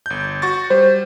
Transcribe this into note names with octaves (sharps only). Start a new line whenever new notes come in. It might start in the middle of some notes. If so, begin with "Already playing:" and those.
G1 G6
F#4 C#6 A6
G3 C5